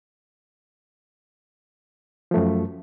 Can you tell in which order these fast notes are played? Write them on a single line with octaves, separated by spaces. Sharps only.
F3 A3 F#2